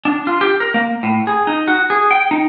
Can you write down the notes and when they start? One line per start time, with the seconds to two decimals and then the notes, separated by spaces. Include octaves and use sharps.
0.05 D4
0.27 F4
0.41 G4
0.60 A#4
0.74 A#3
1.03 A2
1.27 G#4
1.47 D#4
1.68 F#4
1.90 G#4
2.11 G5
2.31 D#4